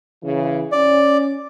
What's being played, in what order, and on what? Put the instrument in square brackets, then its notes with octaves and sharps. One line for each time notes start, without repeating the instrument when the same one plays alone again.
[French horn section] C#3 E3
[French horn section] C#4 [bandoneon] D5